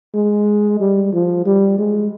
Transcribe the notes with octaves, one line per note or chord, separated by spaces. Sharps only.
G#3
G3
F3
G3
G#3